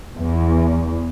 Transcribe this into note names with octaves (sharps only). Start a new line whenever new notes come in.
E2